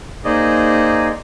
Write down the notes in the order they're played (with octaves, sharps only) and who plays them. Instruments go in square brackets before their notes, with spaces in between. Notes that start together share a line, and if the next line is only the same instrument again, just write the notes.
[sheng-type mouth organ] A#3 D#4 G#4 C5 D5 D#5